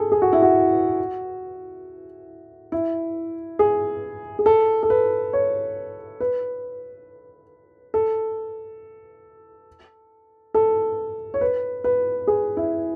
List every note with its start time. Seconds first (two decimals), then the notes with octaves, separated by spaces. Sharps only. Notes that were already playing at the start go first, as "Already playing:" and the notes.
Already playing: G#4 A4
0.12 G#4
0.22 F#4
0.33 E4
0.42 F#4
2.72 E4
3.59 G#4
4.39 G#4
4.46 A4
4.83 A4
4.90 B4
5.33 C#5
6.20 B4
7.94 A4
10.54 A4
11.34 C#5
11.41 B4
11.84 B4
12.27 G#4
12.57 E4